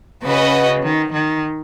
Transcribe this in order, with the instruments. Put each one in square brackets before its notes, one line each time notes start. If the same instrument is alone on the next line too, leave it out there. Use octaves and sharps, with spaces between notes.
[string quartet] C#3 [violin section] C#4 F#4 B4 D#5
[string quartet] D#3
D#3